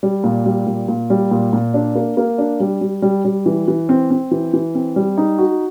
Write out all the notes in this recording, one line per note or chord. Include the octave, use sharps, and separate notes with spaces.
G3
A#2
G3
A#2
A#2
G3
A#2
A#2
D4
A#3
A#3
D4
G3
G3
G3
G3
E3
E3
C4
C4
E3
E3
C4
G3
D#4
F#4